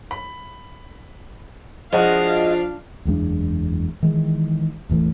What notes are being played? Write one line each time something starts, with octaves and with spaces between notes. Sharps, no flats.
B5
F3 G#3 D4 F4 F#4 F5
F#1 E2 G#3 D4
D#3 E3 G#3
E1 A1 E3 A3